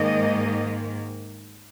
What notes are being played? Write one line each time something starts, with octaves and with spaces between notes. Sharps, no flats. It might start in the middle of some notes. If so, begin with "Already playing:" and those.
Already playing: G#2 D#3 A#3 D#5